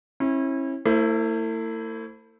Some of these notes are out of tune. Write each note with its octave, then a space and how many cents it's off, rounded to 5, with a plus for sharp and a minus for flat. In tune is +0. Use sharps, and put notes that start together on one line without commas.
C#4 -40 E4 -15
A3 +45 E4 +0 C5 +0